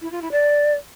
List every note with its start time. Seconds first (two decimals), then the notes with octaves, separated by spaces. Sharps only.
0.02 E4
0.12 F4
0.21 E4
0.31 D5